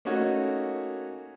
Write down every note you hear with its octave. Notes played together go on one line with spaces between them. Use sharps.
A3 A#3 C#4 D#4 F#4 C#5